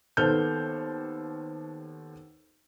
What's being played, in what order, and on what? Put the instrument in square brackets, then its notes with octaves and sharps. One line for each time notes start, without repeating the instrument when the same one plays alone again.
[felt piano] D#2 B3 A4 C5 F6 G6